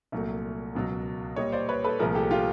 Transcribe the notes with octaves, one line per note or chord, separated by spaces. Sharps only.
C2 A#2 F#3 A3
C#2 B2 F#3
A#2 G3 C#5 D#5
C5 D5
B4 C#5
A4 B4
C2 A#2 F3 A3 G#4 A#4
G4 A4
F4 G4